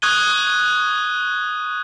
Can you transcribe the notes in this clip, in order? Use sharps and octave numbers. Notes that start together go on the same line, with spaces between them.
C#6 D#6 F#6 G#6 D#7 G7